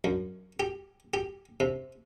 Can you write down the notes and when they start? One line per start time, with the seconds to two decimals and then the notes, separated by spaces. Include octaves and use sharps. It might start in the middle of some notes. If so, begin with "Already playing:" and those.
0.04 F#2
0.60 G4
1.14 G4
1.60 C3